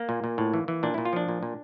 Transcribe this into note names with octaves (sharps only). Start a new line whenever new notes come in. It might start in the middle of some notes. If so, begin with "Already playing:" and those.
Already playing: A#3
A#2
A#2
A2
E3
E3
A#2 D4
A#2 E4
F4
F3 D4
A#2
A#2